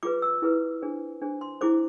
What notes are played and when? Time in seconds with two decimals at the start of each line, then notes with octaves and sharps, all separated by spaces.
0.03 F4 G#4 B4 D6
0.22 E6
0.42 E4 G#4 B4
0.82 D4 G#4 C5
1.22 D4 G#4 C5
1.41 C6
1.61 E4 G#4 C5 D6